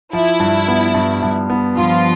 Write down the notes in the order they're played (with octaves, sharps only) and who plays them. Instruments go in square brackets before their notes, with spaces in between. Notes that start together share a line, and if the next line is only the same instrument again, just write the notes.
[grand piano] F3 [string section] E4
[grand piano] G2
B3
G2
G2
B3
[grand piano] G2 [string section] F3 F4